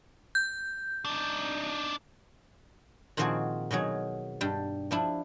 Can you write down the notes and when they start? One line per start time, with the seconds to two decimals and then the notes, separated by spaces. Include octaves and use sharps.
0.35 G6
1.05 D4 D#4
3.17 A#2 D#3 F3 C4 F#4 G#4
3.71 B2 D#3 F#3 G#4
4.41 G2 G3
4.91 F3 D4 E4